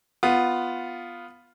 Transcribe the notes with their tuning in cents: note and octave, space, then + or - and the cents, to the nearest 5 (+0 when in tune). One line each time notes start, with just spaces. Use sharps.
B3 +0 F4 +0